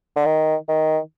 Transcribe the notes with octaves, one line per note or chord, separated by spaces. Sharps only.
D3
D#3
D#3